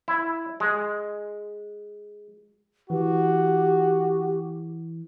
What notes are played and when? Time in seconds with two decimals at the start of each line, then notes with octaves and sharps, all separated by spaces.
0.08 E4
0.60 G#3
2.90 E3 F#4 G4